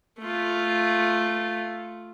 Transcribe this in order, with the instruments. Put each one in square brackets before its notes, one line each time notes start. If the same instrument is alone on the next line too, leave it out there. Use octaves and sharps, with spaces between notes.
[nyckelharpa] A3 F4